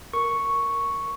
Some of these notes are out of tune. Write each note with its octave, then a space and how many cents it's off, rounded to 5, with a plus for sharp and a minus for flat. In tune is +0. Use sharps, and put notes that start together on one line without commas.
A#4 +0 C#6 +0